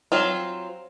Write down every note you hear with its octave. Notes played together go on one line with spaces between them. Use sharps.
F#3 C4 F4